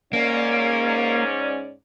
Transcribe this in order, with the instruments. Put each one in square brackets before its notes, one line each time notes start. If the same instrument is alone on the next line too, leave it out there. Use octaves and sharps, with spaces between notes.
[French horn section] G#2 C#4 D5 [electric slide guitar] A#3